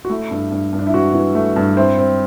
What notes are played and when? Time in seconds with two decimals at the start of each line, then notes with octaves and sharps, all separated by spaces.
0.05 F#4
0.10 A3 E4
0.31 G2
0.51 G2
0.73 G2
0.79 D4
0.87 E4
0.94 E3 F#4
1.14 E3
1.35 A3
1.56 G2
1.77 C4 E4
1.99 C4